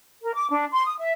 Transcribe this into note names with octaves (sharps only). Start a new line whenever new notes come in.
A#4
D6
D4
C6
D#6
E5